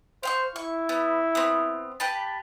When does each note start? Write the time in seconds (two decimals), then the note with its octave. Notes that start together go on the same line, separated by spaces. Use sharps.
0.23 C5 F5 G5 C#6
0.56 E4 C#6
0.89 B3
1.35 B3 C4
2.00 G4 B4 A5